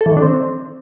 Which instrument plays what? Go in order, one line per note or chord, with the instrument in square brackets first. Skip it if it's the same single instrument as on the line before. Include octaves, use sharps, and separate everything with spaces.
[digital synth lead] A4
E3
D#3
D4
C4